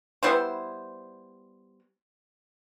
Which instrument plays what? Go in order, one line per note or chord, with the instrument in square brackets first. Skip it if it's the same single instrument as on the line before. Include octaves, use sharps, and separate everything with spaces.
[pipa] G3 B3 E4 C5